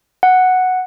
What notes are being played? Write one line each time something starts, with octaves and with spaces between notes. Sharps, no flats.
F#5